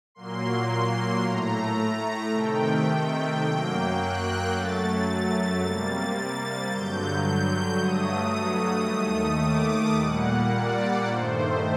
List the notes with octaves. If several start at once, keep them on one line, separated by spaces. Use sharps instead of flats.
A#2 F#3 A#3 C6
A2 A3 A#5
C3 D#3 A3 G5
G5
F#2 F#3 A#3 G5
F#6
F#2 F#3 A3 A6
A6
C3 G3 A#3
A6
G2 D3 F#3 G6
G6
G2 F#3 A3 D#6
D#2 D#3 A3 D#6
D6
A#2 G3 A#3 F#5
D5
G2 D#3 A3 C5